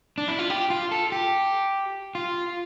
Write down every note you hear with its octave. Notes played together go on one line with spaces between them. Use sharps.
D4
E4
F4
G4
F4
A4
G4
F4